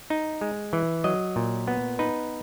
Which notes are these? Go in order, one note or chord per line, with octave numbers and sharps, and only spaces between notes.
D#4
G#3
E3
F#3 D#5
A#2
B3
D#4 B4